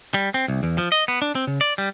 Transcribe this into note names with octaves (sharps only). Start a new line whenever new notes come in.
G3
C4
C2
E2
F3
D#5
B3
D4
C4
C#3
D5
G3